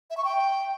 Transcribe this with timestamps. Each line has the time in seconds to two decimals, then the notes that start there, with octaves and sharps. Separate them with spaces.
0.10 E5
0.17 C#6
0.25 G5